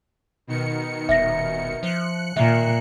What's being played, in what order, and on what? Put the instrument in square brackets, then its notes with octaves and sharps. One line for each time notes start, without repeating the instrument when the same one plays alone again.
[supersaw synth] B2 D#3 C#7
[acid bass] D#1 [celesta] E5 A#6
[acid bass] F3 [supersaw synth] F#6 C#7
[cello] A#2 [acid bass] D#3 [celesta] E5